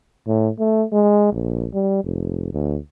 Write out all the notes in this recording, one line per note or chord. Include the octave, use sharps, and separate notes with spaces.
A2
A3
G#3
A#1
G3
F1
D2